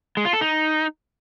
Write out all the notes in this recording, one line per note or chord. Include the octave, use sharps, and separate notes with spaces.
G#3
F4
A4
D#4